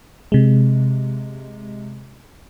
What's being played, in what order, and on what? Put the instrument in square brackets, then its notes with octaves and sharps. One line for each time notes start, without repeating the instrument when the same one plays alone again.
[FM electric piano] C3 G#3